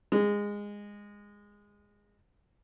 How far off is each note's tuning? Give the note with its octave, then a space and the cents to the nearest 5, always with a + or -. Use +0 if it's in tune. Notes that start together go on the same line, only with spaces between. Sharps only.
G#3 -15